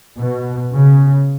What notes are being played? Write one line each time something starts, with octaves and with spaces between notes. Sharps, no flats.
B2
C#3